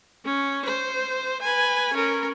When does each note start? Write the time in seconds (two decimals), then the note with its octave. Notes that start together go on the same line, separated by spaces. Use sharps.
0.25 C#4
0.65 C5
1.41 B4 G#5
1.93 C#4 A#4